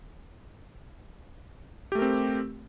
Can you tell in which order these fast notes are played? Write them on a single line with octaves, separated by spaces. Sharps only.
G4 A3 A#4 C4